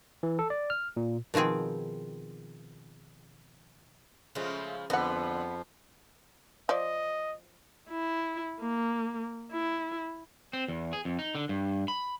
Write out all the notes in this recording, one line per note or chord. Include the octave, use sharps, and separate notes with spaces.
E3
A4
D5
F6
A#2
B2 D#3 F3 C4 G#4
C#3 F3 G#3 A3 F4
F2 D3 F3 B3 D#5 F#5
F3 D5 D#5
E4
A#3
E4
C4
E2
G#4
F2
D#4
D3
G2
B5